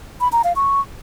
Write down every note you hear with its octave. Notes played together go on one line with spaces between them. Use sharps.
B5
A#5
F5
C#6